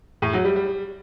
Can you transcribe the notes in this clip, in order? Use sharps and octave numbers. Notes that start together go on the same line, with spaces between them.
A2
F#3
G3
G3